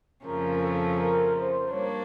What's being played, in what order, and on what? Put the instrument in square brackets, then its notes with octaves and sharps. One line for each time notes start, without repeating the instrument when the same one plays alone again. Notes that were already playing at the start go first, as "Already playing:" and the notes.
[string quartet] F2 C#3 F3 A3 C#4 [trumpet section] A#4
[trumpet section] A4
A#4
C5
[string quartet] G3 A#3 D4 [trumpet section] C#5